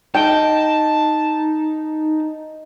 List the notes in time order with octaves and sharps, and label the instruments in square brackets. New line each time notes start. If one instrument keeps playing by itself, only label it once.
[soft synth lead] D#4 [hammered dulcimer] D#5 [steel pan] G5 [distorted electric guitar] A5